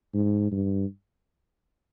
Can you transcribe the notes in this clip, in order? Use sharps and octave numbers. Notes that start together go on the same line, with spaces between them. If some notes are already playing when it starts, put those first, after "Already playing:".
G#2
G2